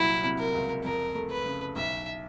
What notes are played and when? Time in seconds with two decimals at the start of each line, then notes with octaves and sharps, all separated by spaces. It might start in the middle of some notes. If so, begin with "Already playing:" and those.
Already playing: C2 A#2 F#3 E4
0.24 C3
0.39 A#4
0.55 C#2
0.84 F2 A#4
1.15 A3
1.31 B4
1.46 C#3
1.76 B1 E5